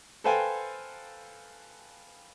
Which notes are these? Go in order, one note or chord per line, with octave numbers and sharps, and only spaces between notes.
A4 B4 C5 F5 G5 G#5